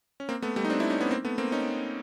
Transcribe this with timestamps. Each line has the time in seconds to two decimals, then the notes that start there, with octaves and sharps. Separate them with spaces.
0.20 C#4
0.29 A#3 C4
0.42 A3 B3
0.56 G3 A3
0.65 D#4
0.70 C4 D4
0.80 D4 E4
0.90 C#4 D#4
1.00 B3 C#4
1.11 A#3 C4
1.25 A3 B3
1.38 A#3 C4
1.52 C#4 D#4